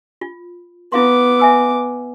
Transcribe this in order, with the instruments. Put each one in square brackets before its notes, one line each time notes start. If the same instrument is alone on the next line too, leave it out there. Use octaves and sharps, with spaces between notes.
[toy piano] F4
[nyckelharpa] B3 D6 [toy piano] E4 F5 C6
[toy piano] E5 G#5 E6